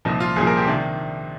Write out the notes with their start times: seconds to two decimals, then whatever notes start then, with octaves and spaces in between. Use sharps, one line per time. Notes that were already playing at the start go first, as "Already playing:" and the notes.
0.05 C2 A#2 F3 D#4
0.20 F4
0.36 C2 A#2 F3 G#4
0.47 A#4
0.57 G4
0.67 C3 D#3 D4